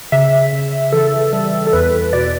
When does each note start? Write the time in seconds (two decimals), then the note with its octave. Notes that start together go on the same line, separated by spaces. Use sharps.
0.12 C#3 E5
0.52 C#3
0.92 E3 A4
1.32 G3 A4
1.67 A4
1.73 E2 B4
2.13 B2 D5